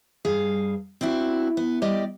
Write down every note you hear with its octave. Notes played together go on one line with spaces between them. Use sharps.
G2 G#4 F5
C4 D4 E4 F#4
B3
G3 G4 D5 D#5